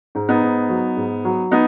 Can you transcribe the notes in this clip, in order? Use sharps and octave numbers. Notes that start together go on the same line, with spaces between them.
G#2
B3 D#4
G#2
F#3
G#2
F#3
B3 D#4